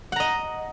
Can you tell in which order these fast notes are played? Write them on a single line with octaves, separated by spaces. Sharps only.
F#5 A#5 D#5